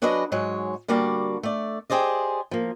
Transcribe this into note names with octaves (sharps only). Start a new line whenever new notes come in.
F#3 D4 F#4 G#4 B4 D#5
G#2 F#3 G#3 C#5
D3 G3 A#3 F#4 D5 A5
A3 D5
G4 G#4 C5 D5 D#5
F3 A#3